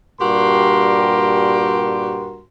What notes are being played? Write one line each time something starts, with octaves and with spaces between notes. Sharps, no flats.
G2 A#2 F#4 G4 A#4 C6